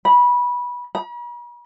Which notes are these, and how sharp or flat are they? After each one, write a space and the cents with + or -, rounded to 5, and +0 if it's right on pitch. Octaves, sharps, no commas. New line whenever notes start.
B5 -20
B5 -45